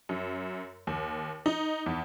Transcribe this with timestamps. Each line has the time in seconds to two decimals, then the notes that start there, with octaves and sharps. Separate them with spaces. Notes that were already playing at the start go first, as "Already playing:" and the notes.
0.09 F#2
0.87 D#2
1.46 D#4
1.86 E2